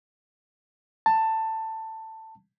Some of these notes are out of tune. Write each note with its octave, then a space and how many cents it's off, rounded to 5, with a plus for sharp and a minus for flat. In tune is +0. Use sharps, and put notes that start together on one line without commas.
A5 +15